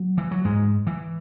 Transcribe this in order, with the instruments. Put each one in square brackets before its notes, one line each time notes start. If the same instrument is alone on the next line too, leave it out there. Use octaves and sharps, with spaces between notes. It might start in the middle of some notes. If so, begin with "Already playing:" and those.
Already playing: [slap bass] F#3
E3
F#3
G#2 G#3
E3